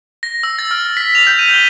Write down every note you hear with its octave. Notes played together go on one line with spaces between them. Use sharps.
A#6
E6
A6
F6
B6
F7
G6
D#7
G7